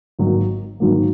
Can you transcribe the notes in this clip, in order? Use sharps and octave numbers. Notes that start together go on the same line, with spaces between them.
G#1 G#2 D#3 F#3 A#3
G#1 G#2 D#3 F#3 A#3